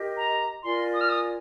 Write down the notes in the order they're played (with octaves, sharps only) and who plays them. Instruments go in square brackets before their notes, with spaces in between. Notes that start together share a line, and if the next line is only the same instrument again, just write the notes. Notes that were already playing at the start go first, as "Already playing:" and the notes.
Already playing: [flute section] G4 A#4 D#5
[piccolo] A#5
[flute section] F4 A#4 D5 G#5 [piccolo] C6
[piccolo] D#6
F6
D#6